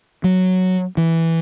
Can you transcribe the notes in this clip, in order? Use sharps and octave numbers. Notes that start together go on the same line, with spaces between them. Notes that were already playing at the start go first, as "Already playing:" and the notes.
F#3
E3